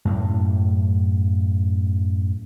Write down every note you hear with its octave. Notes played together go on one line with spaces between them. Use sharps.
F#2 A2 A#3